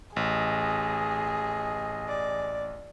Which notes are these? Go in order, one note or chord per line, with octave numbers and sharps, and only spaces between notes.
A1 G#4 D#5
D5